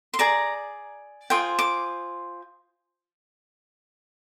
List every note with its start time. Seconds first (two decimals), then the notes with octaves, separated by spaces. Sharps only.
0.14 C6
0.19 G#4 D5 A#5
1.30 F4 G#4 C5 G5
1.59 D6